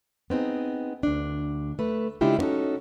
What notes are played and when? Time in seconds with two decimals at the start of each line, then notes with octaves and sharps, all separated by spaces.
0.30 B3 C4 D#4 G#4
1.03 D2 D4
1.79 A3 B4
2.21 C#3 G#3 D4 E4 F4 G4
2.39 B3 C#4 D#4 F#4 A4